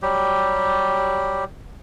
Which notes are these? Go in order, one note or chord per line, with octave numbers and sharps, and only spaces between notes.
F#3 G3 G4